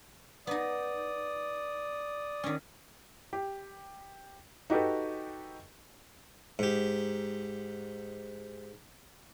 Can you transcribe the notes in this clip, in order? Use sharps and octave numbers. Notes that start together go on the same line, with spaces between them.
B3 D#4 D5 D#6
D#3 C#4
G4
D#4 F#4 G4 A4 B4
G#2 G4